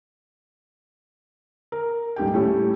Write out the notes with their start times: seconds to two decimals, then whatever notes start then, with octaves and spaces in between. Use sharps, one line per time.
1.72 A#4
2.16 D#1 G#2 G4 G5
2.34 A2 G3 A3 C#4 G4